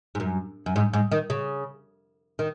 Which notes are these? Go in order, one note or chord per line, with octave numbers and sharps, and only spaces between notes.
G#2
F#2
F#2
G#2
G#2
D#3
C#3
D#3